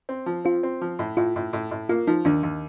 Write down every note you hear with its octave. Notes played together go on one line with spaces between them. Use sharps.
C4
F3
C4 F4
C4
F3
A2
A2 F4
A2
A2
A2
A#3 F4
F3 D#4
D#2 D4
D#2